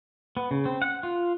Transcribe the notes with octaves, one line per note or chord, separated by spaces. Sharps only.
B3
C#3
C4
F#5
F4